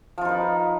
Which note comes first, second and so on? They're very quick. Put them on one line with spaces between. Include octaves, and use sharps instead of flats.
F3 F4 D#4 B4